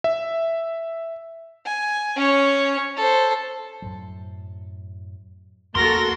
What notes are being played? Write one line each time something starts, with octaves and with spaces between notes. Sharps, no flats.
E5
G#5
C#4 C#5
A4 C5
F#2 A2 F#3
A1 E2 A#3 F#4 A4 A#4 C6 A#6